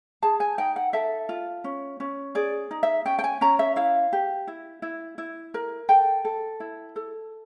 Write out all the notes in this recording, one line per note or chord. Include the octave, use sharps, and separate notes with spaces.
G#4 A5
G#5
D#4 G5
F#5
A4 E5
F4
C#4
C#4
G#4 D5
D#4
E5
C#4 G5
G5
G#5
C#4 A#5
E5
E4 F5
G4
E4
E4
E4
A#4
A4 G5
A4
E4
A4